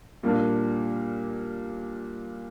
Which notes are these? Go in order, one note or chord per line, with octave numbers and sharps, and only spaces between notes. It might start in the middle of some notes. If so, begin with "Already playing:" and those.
A#2 G3 A#3 D4